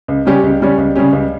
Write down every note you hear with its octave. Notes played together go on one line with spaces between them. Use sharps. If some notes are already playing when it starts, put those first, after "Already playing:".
C#2
C#3 G3 C#4 G4
C#2
C#3 G3 C#4 G4
C#2
C#3 G3 C#4 G4
C#2